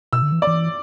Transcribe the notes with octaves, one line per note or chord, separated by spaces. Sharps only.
B2 E6
D3
E3
D5
E3